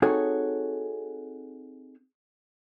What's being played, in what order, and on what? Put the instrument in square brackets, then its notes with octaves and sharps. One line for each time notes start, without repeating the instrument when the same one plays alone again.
[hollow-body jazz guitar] C4 D#4 F#4 G#4 A4 C#5